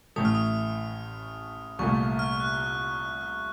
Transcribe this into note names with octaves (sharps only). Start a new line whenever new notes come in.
A1 A2 A3 D#6
F6
D#6
C2 A#2 A3 C#6
F6
F#6
F6